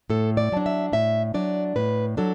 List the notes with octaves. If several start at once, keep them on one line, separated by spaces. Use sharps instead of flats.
A2 A4
D5
F#3 D4
E5
A2 E5
F#3 D4 D5
A2 B4
F#3 D4 A4